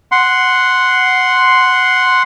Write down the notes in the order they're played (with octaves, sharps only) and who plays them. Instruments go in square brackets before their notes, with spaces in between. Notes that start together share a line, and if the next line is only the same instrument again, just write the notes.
[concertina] F#5 C6